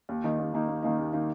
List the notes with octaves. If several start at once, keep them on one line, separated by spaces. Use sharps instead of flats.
D#2
D#3 A#3 D#4
D#2
D#3 A#3 D#4
D#2
D#3 A#3 D#4
D#2
D#3 A#3 D#4